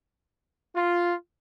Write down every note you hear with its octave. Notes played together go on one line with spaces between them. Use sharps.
F4